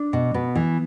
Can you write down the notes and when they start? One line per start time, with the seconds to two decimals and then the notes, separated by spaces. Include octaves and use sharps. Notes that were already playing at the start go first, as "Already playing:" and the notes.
Already playing: D4
0.13 B2
0.34 B2 B3
0.55 E3